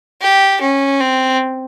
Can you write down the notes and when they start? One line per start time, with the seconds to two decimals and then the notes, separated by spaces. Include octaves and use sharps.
0.21 G4
0.61 C#4
1.00 C4